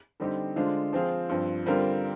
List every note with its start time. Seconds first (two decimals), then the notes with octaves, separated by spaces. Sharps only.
0.20 D3 G3 C4 D#4 G4
0.56 D3 G#3 D4 F4 C5
0.93 F3 C4 F4 G#4
1.29 G2 F3 C4
1.66 D3 G3 C4 F4 A#4